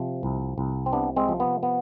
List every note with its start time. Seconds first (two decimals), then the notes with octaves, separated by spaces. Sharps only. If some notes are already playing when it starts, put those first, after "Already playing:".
Already playing: C3 F3
0.23 C2
0.58 C2
0.86 C4
0.93 C3 B3 D4
1.16 G#3 C4
1.29 F3
1.40 B3
1.63 B3